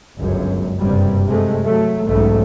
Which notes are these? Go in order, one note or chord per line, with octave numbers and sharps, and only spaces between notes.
G1 C#2 F#2
F#1 G2 C3 G3
C3 G#3 A3
F#3 A3
B1 E2 G#2 C#3 A3